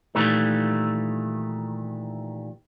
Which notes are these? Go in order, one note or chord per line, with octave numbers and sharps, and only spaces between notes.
A#2 D#3 E3 G3 A3